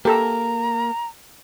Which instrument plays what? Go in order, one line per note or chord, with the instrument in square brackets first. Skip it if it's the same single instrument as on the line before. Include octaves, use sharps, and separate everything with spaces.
[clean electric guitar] A#3 [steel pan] G4 A4 E6 [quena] A#5